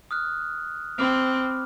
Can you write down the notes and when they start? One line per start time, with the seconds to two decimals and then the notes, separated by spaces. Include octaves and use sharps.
0.11 D#6 F6 F#6
0.99 C4 B5 D6 F6